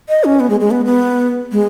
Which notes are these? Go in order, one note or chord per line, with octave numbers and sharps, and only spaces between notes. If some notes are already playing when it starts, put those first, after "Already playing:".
D#5
C#4
B3
G#3
G#3
B3
B3
G#3